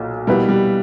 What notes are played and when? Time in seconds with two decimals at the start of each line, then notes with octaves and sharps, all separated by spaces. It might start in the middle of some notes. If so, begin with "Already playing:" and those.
Already playing: B1 A#2
0.27 B2 G3 A#3 E4 B4
0.49 G3